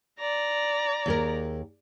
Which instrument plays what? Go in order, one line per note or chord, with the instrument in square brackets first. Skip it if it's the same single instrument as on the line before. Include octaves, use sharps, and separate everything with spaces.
[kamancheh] D5 A#5
[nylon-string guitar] D#2 G#4 A#4